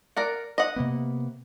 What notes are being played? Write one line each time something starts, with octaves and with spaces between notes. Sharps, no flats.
A#4 D5 F#5
D#5 F#5
C3 A#3 B3